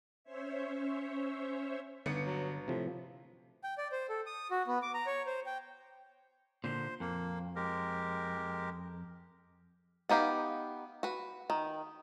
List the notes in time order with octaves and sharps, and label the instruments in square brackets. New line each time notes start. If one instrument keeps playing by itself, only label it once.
[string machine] C#4 C5 C#5 E5
[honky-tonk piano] G1 B3 C#7 [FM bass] D3
[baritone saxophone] F#3
[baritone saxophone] A2 [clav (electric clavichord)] C3 F3
[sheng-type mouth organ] G5
D5
C5
A4
D#6
F#4
B3
D6
A#5
C#5
C5
G5
[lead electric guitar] A#2 D3 [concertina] C5
[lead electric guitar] F2 [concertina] A#3
[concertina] G#3 G4 A#4
[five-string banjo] B3 D#4 G4 F5
F#4 B4
D#3